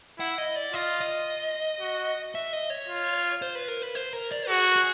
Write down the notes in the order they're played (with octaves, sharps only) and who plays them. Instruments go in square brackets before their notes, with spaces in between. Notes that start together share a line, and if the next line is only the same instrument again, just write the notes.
[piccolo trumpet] E4 [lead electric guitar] F#5
[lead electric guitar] D#5
D5
[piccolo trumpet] F4 [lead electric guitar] D#5
[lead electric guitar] D#5
[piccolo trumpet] F#4
[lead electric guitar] E5
D#5
C#5
[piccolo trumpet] F4
[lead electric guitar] C5
B4
A#4
B4
C5
A#4
D5
[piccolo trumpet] F#4 [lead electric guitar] G#4
[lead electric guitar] G#4